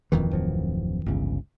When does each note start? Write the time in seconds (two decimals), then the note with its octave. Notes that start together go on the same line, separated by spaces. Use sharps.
0.12 D#1 F2 D#3 E3
0.31 D1 F3 F#3
1.06 G1 C#2 C#3